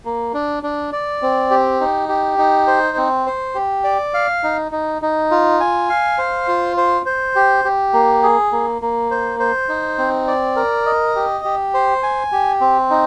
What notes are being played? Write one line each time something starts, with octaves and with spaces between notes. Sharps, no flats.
A#3
D4
D4
D5
C4
G4
D#4
G4
D#4
C5
C4
C5
G4
D5
F5
D#4
D#4
D#4
F4
G#5
F5
C5
F4
C5
C5
G4
G4
A#3
G#4
A#3
A#3
C5
C5
D#4
C4
D5
A#4
D#5
G4
G4
C5
G#5
G4
C4
D#4